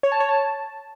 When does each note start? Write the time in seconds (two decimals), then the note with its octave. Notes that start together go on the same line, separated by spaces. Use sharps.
0.03 C#5
0.12 A5
0.20 C#5
0.29 A5